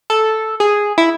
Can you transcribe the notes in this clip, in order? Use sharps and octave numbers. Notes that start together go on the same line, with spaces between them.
A4
G#4
E4